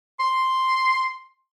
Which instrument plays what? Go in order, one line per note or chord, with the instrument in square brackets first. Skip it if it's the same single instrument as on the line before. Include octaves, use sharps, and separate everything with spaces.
[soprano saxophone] C6